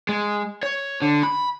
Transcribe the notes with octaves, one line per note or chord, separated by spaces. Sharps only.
G#3
C#5
D3
B5